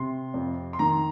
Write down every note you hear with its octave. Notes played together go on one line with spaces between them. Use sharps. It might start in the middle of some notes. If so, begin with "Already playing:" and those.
Already playing: C3 C6
F2
C6
D#3 A#5